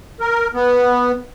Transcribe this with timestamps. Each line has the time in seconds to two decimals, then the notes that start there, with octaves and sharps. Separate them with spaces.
0.20 A#4
0.54 B3